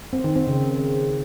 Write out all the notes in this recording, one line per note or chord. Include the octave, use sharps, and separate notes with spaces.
C4
D#3
C4
C#3